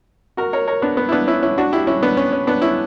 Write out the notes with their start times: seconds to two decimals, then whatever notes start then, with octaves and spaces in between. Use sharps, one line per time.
0.37 F#4 A#4
0.53 A#4 C#5
0.67 A#4 C#5
0.82 B3 D4
0.97 B3
1.09 E4
1.12 B3 D4
1.27 C#4 E4
1.42 C#4 E4
1.58 D4 F#4
1.72 E4 G4
1.87 C#4 E4
2.03 B3 D4
2.17 C#4
2.33 C#4
2.47 B3 D4
2.62 C#4 E4